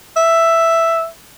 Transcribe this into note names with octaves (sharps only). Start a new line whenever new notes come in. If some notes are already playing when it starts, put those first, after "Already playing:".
E5